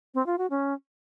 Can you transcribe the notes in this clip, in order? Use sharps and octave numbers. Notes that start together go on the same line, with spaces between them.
C4
F4
F#4
C#4